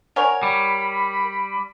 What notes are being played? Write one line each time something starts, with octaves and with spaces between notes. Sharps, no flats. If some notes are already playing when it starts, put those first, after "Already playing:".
A#4 C#5 D5 F#5 G#5
G3 B5